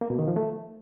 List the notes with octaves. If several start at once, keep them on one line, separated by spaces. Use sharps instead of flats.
A#3
B2
D#3
F3
A3